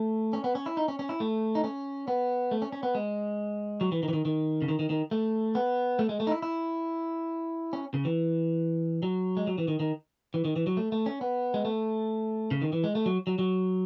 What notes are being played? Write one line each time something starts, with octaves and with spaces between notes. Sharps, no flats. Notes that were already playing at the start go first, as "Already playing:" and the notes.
Already playing: A3
C#4
B3
C#4
E4
D#4
C#4
C#4
E4
A3
D#4
C#4
B3
A3
C#4
C#4
B3
G#3
F#3
E3
D#3
E3
D#3
D#3
C#3
D#3
D#3
D#3
A3
B3
A3
G#3
A3
D#4
E4
E4
C#4
C#3
E3
F#3
G#3
F#3
E3
D#3
D#3
E3
D#3
E3
F#3
A3
A3
C#4
B3
G#3
A3
C#3
D#3
E3
G#3
A3
F#3
F#3
F#3